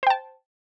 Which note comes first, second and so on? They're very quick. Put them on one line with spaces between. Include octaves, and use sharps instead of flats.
C5 G5 A5